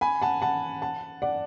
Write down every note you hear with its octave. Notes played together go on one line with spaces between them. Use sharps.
G#5 B5
F#5 A5
F#5 A5
F#5 A5
D5 F#5